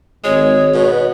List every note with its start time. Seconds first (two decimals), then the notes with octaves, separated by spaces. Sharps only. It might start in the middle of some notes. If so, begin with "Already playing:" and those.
0.24 G#1 G#3 C#5
0.74 B2